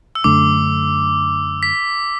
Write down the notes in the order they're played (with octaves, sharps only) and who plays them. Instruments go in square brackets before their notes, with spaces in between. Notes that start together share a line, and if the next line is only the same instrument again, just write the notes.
[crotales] E6
[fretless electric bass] F#2 D3 A3 D4 [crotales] D6
[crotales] B6